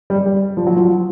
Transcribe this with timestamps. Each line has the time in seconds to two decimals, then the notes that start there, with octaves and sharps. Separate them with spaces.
0.10 G3
0.26 G3
0.57 F3
0.67 F#3
0.76 F3